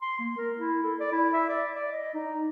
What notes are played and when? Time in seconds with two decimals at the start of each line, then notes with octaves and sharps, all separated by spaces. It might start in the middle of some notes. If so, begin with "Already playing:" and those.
0.02 C6
0.19 A#3
0.37 A#4
0.59 E4
0.83 A4
1.00 D5
1.12 E4
1.34 E5
1.49 D5
1.76 D5
1.92 D#5
2.14 D#4